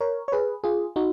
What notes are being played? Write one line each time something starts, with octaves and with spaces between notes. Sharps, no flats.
A#4 C#5
C#5
G#4 B4
F4 G#4
D#4 F#4